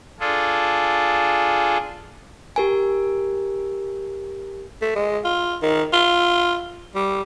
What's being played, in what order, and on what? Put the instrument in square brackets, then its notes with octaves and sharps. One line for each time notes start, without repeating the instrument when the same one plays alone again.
[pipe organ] D4 F4 G#4 A4
[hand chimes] G4 A#4 G#5
[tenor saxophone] A3
G#3
F4
D#3
F4
G3